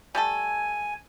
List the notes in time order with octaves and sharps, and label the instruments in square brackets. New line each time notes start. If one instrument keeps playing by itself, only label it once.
[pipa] G3 A3 A4 [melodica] G#5